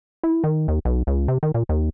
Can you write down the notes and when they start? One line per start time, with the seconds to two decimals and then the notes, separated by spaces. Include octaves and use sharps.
0.23 E4
0.44 D#3
0.68 D#2
0.85 B1
1.07 C#2
1.28 C3
1.43 D#3
1.54 A#2
1.69 D#2